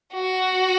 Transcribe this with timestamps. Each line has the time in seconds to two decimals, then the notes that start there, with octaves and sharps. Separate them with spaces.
0.14 F#4